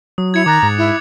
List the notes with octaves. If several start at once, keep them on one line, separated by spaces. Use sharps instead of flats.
F#3 D#6
E4 G#6 C#7 F7
D#3 A#5 D6 F#6 A6
G#2
E4